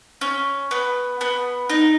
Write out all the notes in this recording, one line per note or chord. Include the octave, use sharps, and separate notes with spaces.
C#4
B3
B3
D#4